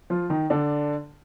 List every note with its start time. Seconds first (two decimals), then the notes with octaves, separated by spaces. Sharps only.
0.10 F3 F4
0.30 D#3 D#4
0.50 D3 D4